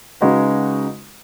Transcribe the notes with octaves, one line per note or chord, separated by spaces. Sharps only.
C#3 G#3 D#4 F#4 B4